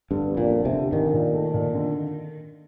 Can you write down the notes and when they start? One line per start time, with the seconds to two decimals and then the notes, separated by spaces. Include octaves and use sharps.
0.11 G2 D3
0.32 F2
0.37 A#2
0.51 D3
0.65 C3
0.72 D3
0.93 A#1 D#3
1.13 A#2
1.33 A3
1.54 A#2
1.74 D3